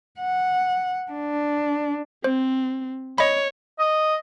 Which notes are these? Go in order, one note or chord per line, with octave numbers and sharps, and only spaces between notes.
F#5
D4
C4 C5
C#5 D#5 B5
D#5